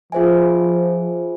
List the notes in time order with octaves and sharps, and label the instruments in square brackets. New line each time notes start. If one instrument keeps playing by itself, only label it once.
[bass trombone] F3 [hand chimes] F4 G#4 C5 E5 G#5